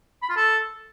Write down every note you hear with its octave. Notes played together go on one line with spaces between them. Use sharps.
B5
F4
A4